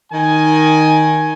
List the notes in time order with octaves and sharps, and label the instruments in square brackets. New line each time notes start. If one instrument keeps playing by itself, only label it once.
[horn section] D#3 G#5